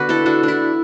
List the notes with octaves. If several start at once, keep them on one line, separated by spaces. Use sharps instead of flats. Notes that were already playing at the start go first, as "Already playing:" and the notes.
Already playing: D3 B3 D4 F#4 B4
E4 A4
D4 F#4
D4 E4